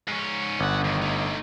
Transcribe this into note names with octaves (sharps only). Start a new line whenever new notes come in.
G#2 C#4
G1 C#4 F#5
A2 D#3
A3 D#4